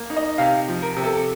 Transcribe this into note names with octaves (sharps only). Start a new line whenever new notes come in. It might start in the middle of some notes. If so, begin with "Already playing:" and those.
Already playing: A#3
D#4
D#5
C3 F5
F3
A#4
C3
A4